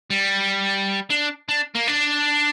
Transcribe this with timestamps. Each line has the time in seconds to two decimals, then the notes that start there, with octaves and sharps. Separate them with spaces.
0.10 G3
1.10 D4
1.49 D4
1.75 A#3
1.88 D4